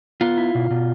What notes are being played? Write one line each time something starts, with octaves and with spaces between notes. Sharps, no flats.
B3 F4
E4
B2
B2